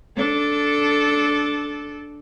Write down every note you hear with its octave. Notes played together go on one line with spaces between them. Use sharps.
D4 A4